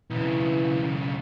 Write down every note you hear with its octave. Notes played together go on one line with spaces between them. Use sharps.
B1 C#3 E3